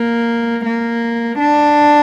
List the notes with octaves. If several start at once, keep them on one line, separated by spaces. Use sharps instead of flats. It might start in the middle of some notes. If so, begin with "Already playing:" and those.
Already playing: A#3
A#3
D4